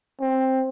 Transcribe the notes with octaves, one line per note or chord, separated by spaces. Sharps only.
C4